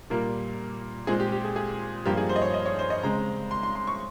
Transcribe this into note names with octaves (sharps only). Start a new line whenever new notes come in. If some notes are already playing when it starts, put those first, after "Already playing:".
A#2 G3 A#3 A#4
A#2 G#3 C4 G#4
G4
G4
G#4
G#4
G2 F3 A#3 G4
G#4
C5
D#5
C#5
D#5
C#5
C5
D#5
C#3 G#3 C4 A#5
C6
C6
C6
C#6